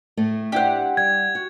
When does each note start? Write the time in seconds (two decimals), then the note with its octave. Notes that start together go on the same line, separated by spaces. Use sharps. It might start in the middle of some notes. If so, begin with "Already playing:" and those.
0.17 A2 A3
0.52 D4 E4 G4 C5 F#5
0.97 G3 G#6
1.35 F#4